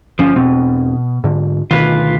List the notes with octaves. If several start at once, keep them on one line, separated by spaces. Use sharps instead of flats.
G1 F3 C#4
E1 B2 C4
G#2 D3
D2 B2 D#3 F4 B4